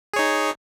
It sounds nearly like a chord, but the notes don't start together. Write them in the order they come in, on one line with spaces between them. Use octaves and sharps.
G#4 C#5 D#4